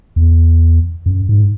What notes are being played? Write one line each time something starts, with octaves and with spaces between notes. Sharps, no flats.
E2
F#2
G#2